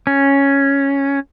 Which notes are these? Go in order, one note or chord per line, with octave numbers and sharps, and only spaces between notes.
C#4